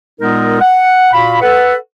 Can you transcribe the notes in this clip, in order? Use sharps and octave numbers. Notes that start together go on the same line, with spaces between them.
A#2 G#3 B3 D#4 A#4
F#5
A#2 F#4 F5 B5
A4 B4 F#5